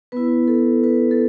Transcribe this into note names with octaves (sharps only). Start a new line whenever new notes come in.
B3 E4 B4
A4
B4
A4